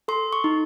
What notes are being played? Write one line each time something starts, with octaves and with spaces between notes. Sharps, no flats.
A4 C6
C#6
D#4